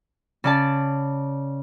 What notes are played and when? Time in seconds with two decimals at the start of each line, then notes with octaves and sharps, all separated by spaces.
0.44 C#3 D5 A5